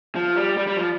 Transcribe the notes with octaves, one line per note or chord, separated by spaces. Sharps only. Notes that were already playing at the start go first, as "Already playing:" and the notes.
F3
G3
G3
G3
F3